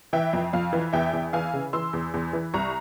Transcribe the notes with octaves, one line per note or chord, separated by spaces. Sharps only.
E3 E5 G5
F2
F2 F5
E3
E2 E5 G5
E2
E3 F5 G#5
C#3
E3 C6 E6
E2
E2
E3
C2 A#5 C#6